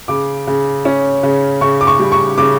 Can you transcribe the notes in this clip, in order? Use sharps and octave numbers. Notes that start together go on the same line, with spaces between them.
C#3 D6
C#3
C#4
C#3
C#3 C#6
D6
C#6
G3
C#6
C#3 D6